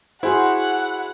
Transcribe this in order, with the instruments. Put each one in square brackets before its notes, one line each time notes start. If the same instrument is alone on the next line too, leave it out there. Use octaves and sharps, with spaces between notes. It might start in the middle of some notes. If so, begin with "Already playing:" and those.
[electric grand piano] E4 [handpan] F#4 G#4 C5 [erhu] F#5